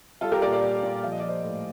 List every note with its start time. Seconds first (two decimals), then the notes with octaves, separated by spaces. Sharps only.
0.21 G3 F4 A4
0.32 G4 A#4
0.42 A#2 A#4 D5
0.52 D5 F5
0.63 G3
0.83 A#2
1.03 F3 F5
1.12 D#5
1.20 D5
1.23 F3
1.28 C5 D#5
1.43 A2